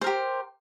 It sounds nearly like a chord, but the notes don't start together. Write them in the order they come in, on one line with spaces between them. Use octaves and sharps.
C5 A#4 G4